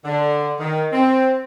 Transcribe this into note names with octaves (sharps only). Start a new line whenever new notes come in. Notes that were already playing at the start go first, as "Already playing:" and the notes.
D3
D#3
C4